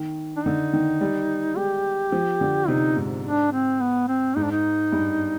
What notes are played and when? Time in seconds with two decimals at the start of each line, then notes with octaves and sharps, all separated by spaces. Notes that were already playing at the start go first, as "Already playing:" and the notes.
Already playing: D#3
0.36 D4
0.45 D3 D#4
0.73 D#3
1.01 G3
1.57 G#3 G4
2.12 F3
2.41 D3
2.68 C3 D#4
2.96 G#2
3.25 D4
3.52 C4
3.81 B3
4.08 C4
4.36 G#2 D#4
4.44 D4
4.51 D#4
4.92 G2